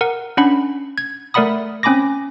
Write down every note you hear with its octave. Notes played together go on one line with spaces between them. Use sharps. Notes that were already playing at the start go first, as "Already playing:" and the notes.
A#4 F#5
C#4 D4 F#5 B5
G#6
A3 A#4 D5 F#5 B5 D#6
C4 C#4 G#5 B5 D6 A#6